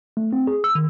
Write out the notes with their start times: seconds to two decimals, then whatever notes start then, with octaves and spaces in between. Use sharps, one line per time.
0.17 A3
0.33 C4
0.47 G#4
0.64 E6
0.75 D#3